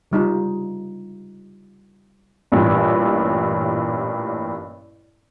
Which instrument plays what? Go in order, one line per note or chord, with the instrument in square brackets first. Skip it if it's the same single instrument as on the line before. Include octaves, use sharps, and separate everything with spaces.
[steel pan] C#3 G3 D#4 F4
[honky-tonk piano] A1 G2 A#2